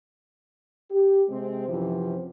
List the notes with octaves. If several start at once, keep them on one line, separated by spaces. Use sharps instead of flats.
G4
C3 G#3 C4
F#2 C3 E3 F3